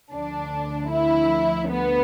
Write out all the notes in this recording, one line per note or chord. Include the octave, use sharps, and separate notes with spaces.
D2 D3 F3 D4
E4
B3